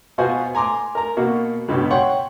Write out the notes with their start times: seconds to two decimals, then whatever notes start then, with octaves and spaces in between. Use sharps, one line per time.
0.18 B2 F4 F#4 B4 C5 G#5
0.55 G#5 A#5 C6 D6
0.95 A#4 A#5
1.17 B2 A#3 F#4
1.68 C#2 G2 B2
1.90 C#5 F#5 G5 C6 C#6